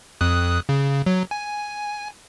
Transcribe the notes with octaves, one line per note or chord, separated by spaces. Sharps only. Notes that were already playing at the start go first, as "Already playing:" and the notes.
F2 D#6 F#6
C#3
F#3
G#5